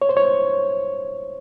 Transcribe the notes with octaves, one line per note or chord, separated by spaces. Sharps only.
C#5
C5
C#5